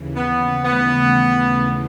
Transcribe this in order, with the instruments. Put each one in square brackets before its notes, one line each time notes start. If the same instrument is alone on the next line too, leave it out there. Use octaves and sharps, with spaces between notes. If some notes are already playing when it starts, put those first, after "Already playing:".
Already playing: [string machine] D#2 C#3 E3
[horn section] B3
[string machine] D#2 C#3 E3 A3 [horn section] B3